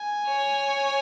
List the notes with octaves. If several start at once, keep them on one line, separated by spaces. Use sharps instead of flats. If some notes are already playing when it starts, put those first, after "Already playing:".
Already playing: G#5
C#5